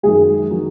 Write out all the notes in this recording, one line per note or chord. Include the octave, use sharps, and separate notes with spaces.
F#2 D#3 G#3 G#4
D#3 F#3